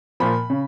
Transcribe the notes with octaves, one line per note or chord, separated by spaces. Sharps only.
A#2 F3 B5
C#3